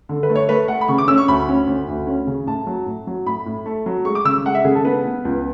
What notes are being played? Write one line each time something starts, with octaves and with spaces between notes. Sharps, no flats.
D3
B4
A3
C#5
A3 B4
A3 F#5
B5
C#3 C#6
D6
C#4 E6
C#6
D2 B5
C#4
D2
D2
C#4
C#3
A2 A5
F#3
A2
F#3
A2 B5
A2
A3
F#3
G#3 C#6
D6
C#3 E6
G#3 F#5
E5
C#3 G#4
A4
B3 B4
B3
C#2